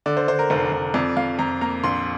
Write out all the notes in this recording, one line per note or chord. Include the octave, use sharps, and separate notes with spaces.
D3 D5
C5
D3 C5
A#4
F1 C5
F1
F2 D5
F2 F5
F2 A#5
A#3 A#5
A#1 C6